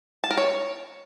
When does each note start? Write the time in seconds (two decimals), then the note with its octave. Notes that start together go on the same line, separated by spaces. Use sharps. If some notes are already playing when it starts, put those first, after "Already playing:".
0.24 A5
0.31 A#4
0.37 C#5